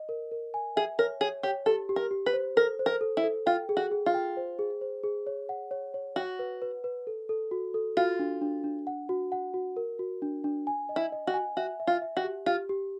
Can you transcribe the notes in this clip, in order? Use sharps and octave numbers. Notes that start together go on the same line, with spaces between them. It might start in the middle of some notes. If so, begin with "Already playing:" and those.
Already playing: D#5
A#4
A#4
G#5
G#4 E5
A#4 C#5
G#4 C#5
G4 C#5
G4 A4
G4
A#4
G4
B4
C5
A4 A#4
C5
A#4
A4
E4
A4
F4 G5
G#4
F#4
G#4
F4
G5
C5
G#4
C5
G#4
C#5
F#5
C#5
C#5
F#4 F#5
B4
B4
B4
A4
A4
F#4
A4
F4 F#4
D4
D4
D4
F#5
F#4
F#5
F#4
A#4
F#4
D4
D4
G#5
D#5
E4
D#5
F#4
G#5
F#4 E5
E5
F4
E5
F#4
G4
F4 G4
G4